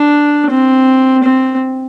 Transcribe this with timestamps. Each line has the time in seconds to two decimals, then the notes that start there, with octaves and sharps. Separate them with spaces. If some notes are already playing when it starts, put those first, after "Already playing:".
Already playing: D4
0.51 C4
1.24 C4